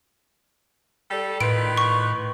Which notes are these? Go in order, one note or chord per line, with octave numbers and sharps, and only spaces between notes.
G3 A4
A2 D#3 F4 B4 D7
C#6